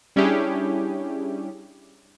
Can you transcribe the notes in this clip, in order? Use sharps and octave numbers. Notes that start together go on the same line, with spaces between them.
G3 C#4 D4 E4 G4 G#4